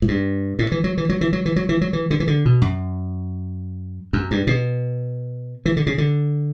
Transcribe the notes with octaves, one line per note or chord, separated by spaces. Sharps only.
A2
G2
A2
E3
F#3
E3
F#3
E3
F#3
E3
F#3
E3
F#3
E3
D3
E3
D3
B2
F#2
F#2
G2
B2
E3
D3
C#3
D3